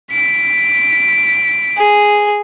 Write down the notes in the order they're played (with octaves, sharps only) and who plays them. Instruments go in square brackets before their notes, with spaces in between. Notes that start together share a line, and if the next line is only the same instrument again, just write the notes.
[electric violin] B6 D7
[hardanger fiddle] G#4